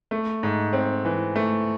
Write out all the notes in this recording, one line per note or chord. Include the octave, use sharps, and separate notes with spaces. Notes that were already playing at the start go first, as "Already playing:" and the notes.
A3
G#2
C4
E3
A3